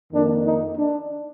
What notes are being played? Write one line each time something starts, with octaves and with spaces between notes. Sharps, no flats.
F2 D#3 A#3 D4
D#4
D4